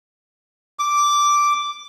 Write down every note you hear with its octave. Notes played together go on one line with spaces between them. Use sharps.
D6